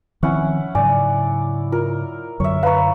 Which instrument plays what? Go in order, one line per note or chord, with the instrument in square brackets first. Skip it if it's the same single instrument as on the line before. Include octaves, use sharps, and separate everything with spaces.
[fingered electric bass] D#3 F3 C4 [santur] C#4 E4 F#5
[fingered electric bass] G#2 C#3 F#3 [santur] D5 [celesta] G#5
[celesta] F4 [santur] A#4
[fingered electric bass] F#2 D3 F#3 [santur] C#5 E5
[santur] B4 C#5 [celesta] F5 A#5